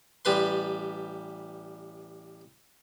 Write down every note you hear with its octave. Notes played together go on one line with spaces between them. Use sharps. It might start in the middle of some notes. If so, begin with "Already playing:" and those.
A1 G3 B4 C6